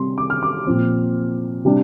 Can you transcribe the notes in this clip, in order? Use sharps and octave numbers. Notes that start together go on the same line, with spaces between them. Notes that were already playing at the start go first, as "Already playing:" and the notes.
Already playing: C3 G3 C4 C6
D6
F6
D6
A#2 F3 C4
C3 G3 D4